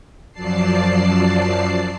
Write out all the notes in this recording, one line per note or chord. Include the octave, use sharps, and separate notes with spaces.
F#2 F3 F#3 D5 A5 C7